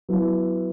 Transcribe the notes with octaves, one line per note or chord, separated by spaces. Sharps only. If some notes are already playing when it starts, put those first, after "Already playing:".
F#3 B3 E4 B4